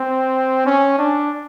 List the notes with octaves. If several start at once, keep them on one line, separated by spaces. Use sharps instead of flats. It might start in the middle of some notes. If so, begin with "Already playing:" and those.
Already playing: C4
C#4
D4